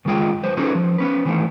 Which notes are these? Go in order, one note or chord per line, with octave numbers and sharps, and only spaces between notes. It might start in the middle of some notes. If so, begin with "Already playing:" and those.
G2 D#3 G#3 F4 G#4 G5
F#3 B4 C5
C#4 D#4 F#4 G#4 A4 B4
F3
B3 C#4 B4
D#3 E3 A3 E4